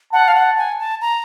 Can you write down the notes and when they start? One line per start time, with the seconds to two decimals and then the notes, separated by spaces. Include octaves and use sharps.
0.13 F#5 A5
0.28 F5
0.35 F#5
0.57 G#5
0.79 A5
1.01 A#5